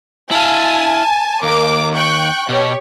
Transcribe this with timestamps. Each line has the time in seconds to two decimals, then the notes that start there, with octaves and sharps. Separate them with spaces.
0.31 E4 F5 G#5 A5
1.43 D#2 A#3 D6
1.95 G5 C#6 F#6
2.49 B2 G4 C#5